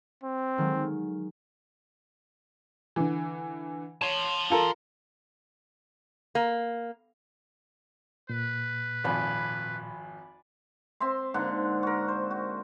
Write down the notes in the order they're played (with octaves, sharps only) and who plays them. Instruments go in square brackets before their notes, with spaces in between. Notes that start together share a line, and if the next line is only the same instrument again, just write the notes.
[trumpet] C4
[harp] D#3 F#3 G#3
[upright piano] D3 E3
[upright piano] C#5 [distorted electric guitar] A5 C6
[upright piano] F4 A4 A#4
[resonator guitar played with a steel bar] A#3
[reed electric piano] A#2 [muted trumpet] B4
[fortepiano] G#1 F2 [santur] D5 G#5 B5
[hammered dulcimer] C4 E5 C6
G#2 D3 A#3 F#5
F#4 A#4
C5
F#4